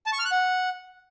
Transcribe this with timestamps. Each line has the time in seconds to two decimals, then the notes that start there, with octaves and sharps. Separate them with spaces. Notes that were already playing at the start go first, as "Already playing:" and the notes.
0.06 A5
0.13 C#6
0.19 F6
0.25 F#6
0.32 F#5